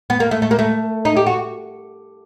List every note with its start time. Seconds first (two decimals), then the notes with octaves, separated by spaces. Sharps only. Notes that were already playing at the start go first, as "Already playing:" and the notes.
0.10 B3
0.20 A#3
0.31 A3
0.42 A3
0.51 A#3
0.59 A3
1.05 D#4
1.16 G4
1.26 F#4